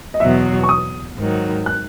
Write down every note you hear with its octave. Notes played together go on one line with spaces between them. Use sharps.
D#5
E2 B2 F#3 E5
C#6
D#6
G#2 D#3 F#3
F#6